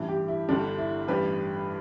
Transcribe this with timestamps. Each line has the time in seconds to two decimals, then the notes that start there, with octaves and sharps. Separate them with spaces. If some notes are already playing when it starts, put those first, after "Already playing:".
Already playing: A1 G2 E3 E4
0.08 G4
0.28 E4
0.49 G1 G2 D3 G3 D4
0.78 E4
1.08 A1 G2 G3 B4